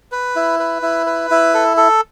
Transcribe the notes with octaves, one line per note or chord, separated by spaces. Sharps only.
B4
E4
B4
E4
B4
E4
A4
A4